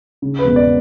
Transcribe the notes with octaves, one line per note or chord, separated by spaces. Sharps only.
C#3
B4
E1
D5